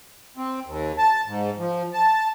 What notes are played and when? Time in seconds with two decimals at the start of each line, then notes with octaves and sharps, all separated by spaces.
0.37 C4
0.66 D#2
0.98 A5
1.27 G#2
1.58 F3
1.93 A5